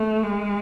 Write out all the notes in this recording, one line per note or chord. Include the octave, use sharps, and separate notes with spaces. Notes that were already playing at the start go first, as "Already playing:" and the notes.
Already playing: A3
G#3